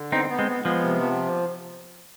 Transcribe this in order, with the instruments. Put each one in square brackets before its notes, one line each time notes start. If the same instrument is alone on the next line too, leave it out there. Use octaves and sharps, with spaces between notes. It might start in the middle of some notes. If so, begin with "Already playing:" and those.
Already playing: [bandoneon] D3
[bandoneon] B3 [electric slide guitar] C4 D#4
[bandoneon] B3
[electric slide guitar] G#3 C4
[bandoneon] B3
[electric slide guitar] F3 G#3 [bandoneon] B3
[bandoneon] C3
F3